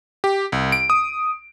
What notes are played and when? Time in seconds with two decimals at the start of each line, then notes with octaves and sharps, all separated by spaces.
0.24 G4
0.52 C2
0.72 D7
0.90 D#6